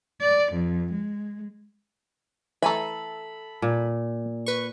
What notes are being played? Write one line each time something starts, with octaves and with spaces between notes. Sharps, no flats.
D5
F2
G#3
E3 A3 A4 E5 G#5 A#5 B5
A#2
B4 C#6